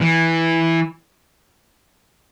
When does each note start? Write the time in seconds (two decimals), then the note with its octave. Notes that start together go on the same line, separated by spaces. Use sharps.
0.01 E3